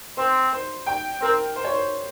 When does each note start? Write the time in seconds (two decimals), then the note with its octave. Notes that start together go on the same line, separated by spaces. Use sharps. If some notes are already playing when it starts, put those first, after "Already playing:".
0.17 C4 C5
0.53 C5
0.86 G5
1.21 C4 A#4
1.56 C5
1.64 C#5
1.73 C5